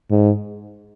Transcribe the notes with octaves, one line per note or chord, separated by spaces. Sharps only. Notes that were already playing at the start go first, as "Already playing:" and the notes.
G#2